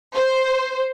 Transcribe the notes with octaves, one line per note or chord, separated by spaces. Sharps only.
C5